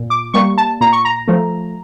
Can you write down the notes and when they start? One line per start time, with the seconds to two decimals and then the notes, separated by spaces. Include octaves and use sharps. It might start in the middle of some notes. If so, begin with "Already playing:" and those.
Already playing: A#2
0.10 D6
0.34 G3 A#3 C#6
0.58 A5
0.81 A#2 A#5
0.92 C#6
1.05 A#5
1.28 F3 A3